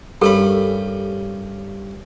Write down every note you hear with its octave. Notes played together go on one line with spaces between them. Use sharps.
G2 C#4 G4 A4 A#4 B5